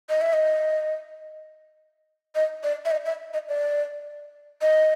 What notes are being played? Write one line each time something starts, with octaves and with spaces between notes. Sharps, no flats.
D#5
E5
D#5
D#5
D5
E5
D#5
E5
D#5
D5
D#5